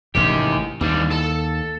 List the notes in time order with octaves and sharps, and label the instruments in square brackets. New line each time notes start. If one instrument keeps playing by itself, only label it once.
[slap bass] A1 G#2 C3 [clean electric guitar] D#3 G4
[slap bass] D#2 [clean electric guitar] E3 G3 D4
[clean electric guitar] A4 A5